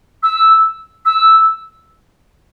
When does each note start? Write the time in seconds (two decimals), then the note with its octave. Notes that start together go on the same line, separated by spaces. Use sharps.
0.23 E6
1.06 E6